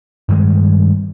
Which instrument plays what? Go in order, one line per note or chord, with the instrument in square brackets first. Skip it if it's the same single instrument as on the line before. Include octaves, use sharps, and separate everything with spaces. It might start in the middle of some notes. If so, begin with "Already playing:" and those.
[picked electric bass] G2 D#3 G3 G#3